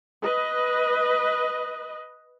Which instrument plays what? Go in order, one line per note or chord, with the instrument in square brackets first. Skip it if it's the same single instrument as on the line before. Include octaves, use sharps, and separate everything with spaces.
[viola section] B4 D#5